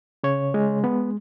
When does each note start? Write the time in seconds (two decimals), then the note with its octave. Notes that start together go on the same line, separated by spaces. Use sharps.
0.23 C#3 C#5
0.54 G#3
0.84 B3